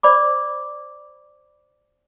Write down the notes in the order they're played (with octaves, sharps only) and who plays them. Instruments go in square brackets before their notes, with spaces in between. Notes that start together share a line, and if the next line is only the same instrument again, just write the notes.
[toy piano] C5 D5 B5 D6